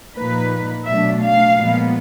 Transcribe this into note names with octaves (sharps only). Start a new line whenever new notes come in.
A#2 F3 A#3 D#4 B4
B2 F#3 A3 D4 E5
F5
A#2 F3 G#3 B3